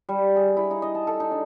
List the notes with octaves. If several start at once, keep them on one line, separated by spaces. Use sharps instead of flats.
G3
G#4
E4
D#4
D#5
A5
A4
D#4
D4